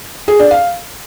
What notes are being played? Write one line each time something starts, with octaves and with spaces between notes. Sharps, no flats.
G#4
D4
F5